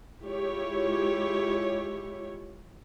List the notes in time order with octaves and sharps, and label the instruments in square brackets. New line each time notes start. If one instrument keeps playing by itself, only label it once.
[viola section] G#3 E4 F4 G4 C#5